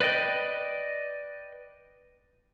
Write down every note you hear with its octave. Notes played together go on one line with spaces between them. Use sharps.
B4 D5 D#5 G5